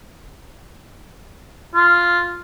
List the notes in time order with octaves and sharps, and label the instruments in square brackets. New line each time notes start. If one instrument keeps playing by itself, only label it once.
[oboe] F4